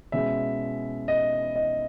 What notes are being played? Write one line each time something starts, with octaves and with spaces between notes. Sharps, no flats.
B2 G#3 C#4 E4 E5
D#5
D#5